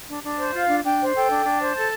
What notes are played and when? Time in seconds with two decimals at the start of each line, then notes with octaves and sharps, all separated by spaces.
0.08 D4
0.23 D4
0.38 C5
0.54 F4 F5
0.68 D4
0.84 D4 G5
0.99 C5
1.14 A4 G5
1.30 D4
1.44 D4
1.60 C5
1.76 A4 A5